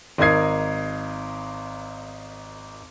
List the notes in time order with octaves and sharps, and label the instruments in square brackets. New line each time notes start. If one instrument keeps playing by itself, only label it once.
[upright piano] G#1 D#4 A#4 D#6 G#6 C7